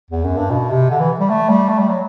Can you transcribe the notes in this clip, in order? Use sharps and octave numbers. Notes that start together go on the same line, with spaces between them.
E2
F#2
G2
B2
C3
D3
E3
G3
A3
G3
A3
G3
F#3